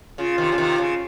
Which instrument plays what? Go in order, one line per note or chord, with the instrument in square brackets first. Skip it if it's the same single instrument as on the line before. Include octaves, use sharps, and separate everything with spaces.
[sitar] C#3 [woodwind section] F4
[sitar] C3 D#3
C#3
C3 D#3
C#3